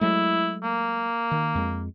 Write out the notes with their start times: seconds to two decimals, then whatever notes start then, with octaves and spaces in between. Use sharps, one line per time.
0.01 F#3 G#3 A3 E4
0.63 A#3
1.31 D#3
1.55 F2 G#3